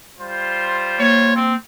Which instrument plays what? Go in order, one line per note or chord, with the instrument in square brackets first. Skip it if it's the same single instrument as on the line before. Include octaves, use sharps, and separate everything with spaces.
[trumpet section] G3 F4 C5
[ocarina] A#3 [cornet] C#5
[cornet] C4